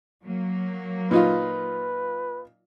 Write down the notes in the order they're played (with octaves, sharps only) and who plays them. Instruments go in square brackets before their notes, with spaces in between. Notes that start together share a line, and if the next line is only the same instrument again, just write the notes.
[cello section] F#3 A#3
[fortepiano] A#2 D#4 F4 [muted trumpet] B4